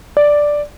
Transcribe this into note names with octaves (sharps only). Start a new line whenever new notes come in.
D5